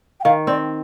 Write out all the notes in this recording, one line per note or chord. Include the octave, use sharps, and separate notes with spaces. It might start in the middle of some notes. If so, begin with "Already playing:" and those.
G5
D#3 F5
C4 D5